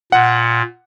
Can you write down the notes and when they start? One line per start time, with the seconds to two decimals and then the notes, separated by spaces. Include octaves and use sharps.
0.12 A#2 F#5